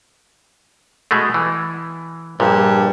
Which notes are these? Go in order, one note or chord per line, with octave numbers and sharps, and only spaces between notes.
B2 G#3 A3
E3
A#1 G2 A#2